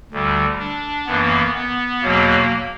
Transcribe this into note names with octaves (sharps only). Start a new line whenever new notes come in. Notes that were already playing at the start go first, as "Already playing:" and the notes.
D2 D3 G3
D4
F#2 E3 A#3 B3
B3
E2 B2 F#3 A#3